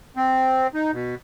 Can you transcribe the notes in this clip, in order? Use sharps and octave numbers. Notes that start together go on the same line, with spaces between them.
C4
D#4
B2